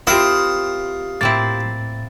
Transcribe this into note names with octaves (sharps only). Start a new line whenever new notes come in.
C4 E4 F4 G4 A#4 D#6
A2 A#3 C4 E4 A6